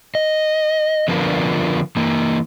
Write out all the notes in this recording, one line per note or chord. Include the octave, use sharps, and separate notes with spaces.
D#5
D3 F3 B3 D4 F4 A#4
E3 A#3